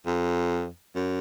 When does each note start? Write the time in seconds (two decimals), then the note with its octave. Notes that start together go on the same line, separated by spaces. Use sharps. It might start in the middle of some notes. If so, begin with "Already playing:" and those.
0.06 F2
0.95 F#2